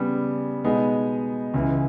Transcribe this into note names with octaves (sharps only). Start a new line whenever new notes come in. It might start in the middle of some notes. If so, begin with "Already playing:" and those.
Already playing: C#3 G3 B3
B2 G#3 B3 D#4 G#4
C#2 C#3 E3